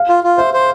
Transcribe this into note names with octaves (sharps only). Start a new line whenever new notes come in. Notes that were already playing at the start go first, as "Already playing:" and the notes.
Already playing: F5
F4
F4
C5 E5
C5